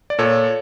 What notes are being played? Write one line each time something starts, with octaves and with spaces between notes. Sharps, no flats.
D5
A#2 A4 C#5